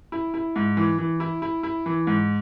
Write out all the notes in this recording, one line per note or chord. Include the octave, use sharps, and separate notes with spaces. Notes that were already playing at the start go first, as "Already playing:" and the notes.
E4
E4
G#2
E3
E3
E4
E4
E4
E3
G#2